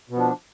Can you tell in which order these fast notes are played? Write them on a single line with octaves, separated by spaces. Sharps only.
B2 B3 F3 D4